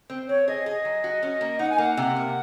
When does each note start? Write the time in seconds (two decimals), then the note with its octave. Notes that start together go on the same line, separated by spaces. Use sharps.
0.10 C4
0.28 C4 C#5
0.48 G#4 D#5
0.66 G#4
0.85 F#3
1.04 F#4
1.23 C#4
1.41 A#3
1.59 D#4 F#5
1.70 G#5
1.78 A#3 F#5
1.97 C3
2.16 A#3